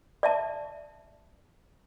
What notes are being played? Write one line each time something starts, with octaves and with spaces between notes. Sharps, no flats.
D5 E5 A5